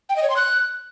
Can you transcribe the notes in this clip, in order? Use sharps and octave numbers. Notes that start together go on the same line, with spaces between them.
G5
D#5
C#5
C6
F#6